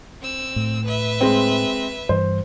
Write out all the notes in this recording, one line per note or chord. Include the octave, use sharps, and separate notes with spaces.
C4 E6
A2
B4 E5
G#3 C4
G2 E3 C5